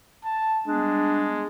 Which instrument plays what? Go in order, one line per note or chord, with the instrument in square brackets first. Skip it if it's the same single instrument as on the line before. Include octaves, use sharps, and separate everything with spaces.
[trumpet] A5
[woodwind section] G3 B3 D4 [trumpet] G#3